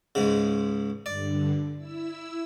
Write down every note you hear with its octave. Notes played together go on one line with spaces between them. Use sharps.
C#2 G#2 C#3
G2 D3 D5
E4 E6